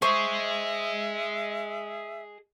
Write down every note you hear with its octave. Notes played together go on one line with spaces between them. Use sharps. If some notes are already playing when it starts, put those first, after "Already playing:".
G#4 C5 D#5 E5 C#6